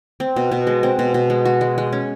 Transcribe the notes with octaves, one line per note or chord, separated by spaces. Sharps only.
C4
B2
B2
G#3
C4
B2
B2
G#3
F#4
G#3
G#3
C#4